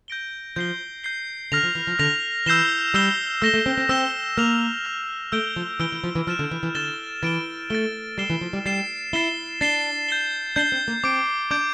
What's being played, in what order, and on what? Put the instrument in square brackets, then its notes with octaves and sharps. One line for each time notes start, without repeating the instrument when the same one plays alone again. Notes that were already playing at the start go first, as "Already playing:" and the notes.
[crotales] G6 A#6 D7 G7
[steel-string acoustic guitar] F3 [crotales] G6 C7 G7
[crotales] G6 C7 G7
[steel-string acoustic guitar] D3 [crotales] F6 A#6 F7
[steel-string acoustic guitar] F3
E3
F3
[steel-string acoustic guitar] D3 [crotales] F6 A#6 F7
[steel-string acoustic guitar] E3 [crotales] E6 G6 C7 E7 G7
[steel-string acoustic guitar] G3 [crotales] E6 G6 C7 E7 G7
[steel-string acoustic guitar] A3 [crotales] E6 A#6 E7 G7
[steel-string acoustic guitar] A3
C4
C4
[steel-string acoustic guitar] C4 [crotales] E6 A#6 E7 G7
[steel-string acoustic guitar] A#3 [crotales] F6 A#6 F7
[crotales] F6 A#6 F7
[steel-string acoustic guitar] A3 [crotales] E6 G6 D7 G7
[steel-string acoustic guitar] F3
[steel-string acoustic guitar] E3 [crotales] E6 G6 D7 G7
[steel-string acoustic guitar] E3
F3
E3
[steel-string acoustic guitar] F3 [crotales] F6 A6 E7 G7
[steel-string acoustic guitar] D3
E3
E3
[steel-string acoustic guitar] D3 [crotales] F6 A6 E7 G7
[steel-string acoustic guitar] E3 [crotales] A6 D7 G7
[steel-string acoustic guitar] A3 [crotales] A6 D7 G7
[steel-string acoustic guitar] G3 [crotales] A6 C7 E7 G7
[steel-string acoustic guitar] E3
F3
G3
[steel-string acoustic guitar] G3 [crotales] A6 C7 E7 G7
[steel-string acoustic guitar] E4 [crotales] A6 C7 E7 G7
[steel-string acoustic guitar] D4 [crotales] A6 C7 E7 G7
[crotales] G6 C7 G7
[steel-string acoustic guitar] D4 [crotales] G6 C7 G7
[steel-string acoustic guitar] C4
A#3
[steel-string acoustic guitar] C4 [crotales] D6 G6 D7
[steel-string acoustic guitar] D4 [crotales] D6 G6 D7